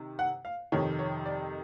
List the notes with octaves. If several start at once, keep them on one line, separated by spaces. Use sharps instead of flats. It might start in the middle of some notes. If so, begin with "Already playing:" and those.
Already playing: C3 D#3
F#5
F5
F2 C3 D#3 C#5
C#5
D5